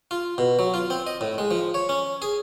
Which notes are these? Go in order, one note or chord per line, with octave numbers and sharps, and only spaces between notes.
F4
B2
F#3
F4
C4
D#5
A2
G#3
F3
C#5
C#4
G#4